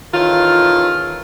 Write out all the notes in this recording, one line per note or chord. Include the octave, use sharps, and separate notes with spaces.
D#3 E3 C#4 F4 G#4 A4